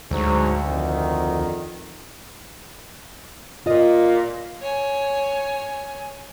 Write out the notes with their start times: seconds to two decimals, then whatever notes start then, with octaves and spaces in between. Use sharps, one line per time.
0.11 D2 G#2 F#3
0.66 F2 D#3
3.66 A#2 F4 D#5
4.61 C#5 G#5